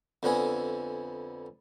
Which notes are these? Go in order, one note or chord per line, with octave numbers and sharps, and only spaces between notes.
F2 D3 B3 G#5